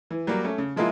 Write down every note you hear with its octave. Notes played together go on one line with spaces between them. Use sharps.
E3
F#3 G3 A#3
A3 C#4
C#3
F3 G#3 A#3 E4 F4